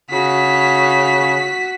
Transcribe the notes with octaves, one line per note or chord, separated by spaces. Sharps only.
C#3 F#4 B6